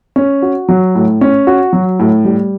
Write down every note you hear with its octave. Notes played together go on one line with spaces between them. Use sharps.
C#4
F#4
F#3
A2
C#4
F#4
F#3
A2
G3